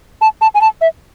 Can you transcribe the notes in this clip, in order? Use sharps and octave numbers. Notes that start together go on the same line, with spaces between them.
A5
A5
G#5
A5
E5